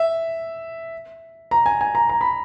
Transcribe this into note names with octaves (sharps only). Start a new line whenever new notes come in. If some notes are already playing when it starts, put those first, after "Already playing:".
Already playing: E5
A#5
G#5
G#5
A#5
A#5
B5